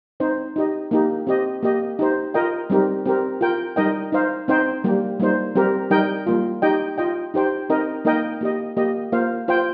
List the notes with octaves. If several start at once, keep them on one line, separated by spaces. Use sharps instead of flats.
C4 D#4 C5
D#4 G4 D#5
A#3 D#4 G4
C4 G4 D#5
A#3 G4 D#5
D#4 G4 C5
F4 A#4 D#5 G5
G3 C4 D#4 G4 A#4
C4 G4 A#4
F4 A#4 G5
G3 D#4 A#4 D#5 G5
D#4 C5 F5
C4 D#4 C5 G5
G3 A#3 G4
G3 A#3 D#4 C5
G3 C4 G4 A#4
G3 D#4 A#4 D#5 G5
G3 A#3 F4
D#4 G4 D#5 G5
F4 D#5 G5
D#4 G4 C5 G5
C4 D#4 A#4 D#5 G5
A#3 D#4 A#4 D#5 G5
A#3 G4 D#5
A#3 G4 D#5
A#3 F4 C5 F5
F4 C5 G5